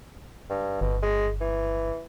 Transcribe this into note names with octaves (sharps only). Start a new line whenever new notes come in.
G2
G1 B2
G#3
E3